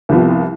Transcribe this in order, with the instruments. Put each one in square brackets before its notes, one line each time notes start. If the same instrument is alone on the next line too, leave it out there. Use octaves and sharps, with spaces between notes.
[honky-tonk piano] C2 C3 F3 B3 F4